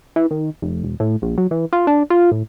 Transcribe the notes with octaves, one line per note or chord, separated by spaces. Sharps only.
E3
D#3
F1
E1
A2
A#1
F#3
E3
F4
D4
F4
A2